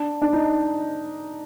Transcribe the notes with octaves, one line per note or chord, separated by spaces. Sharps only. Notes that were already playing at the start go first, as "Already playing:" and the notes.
Already playing: D4
D4
D#4